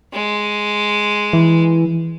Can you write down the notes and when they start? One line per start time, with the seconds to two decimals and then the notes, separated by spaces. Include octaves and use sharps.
0.13 G#3
1.33 E3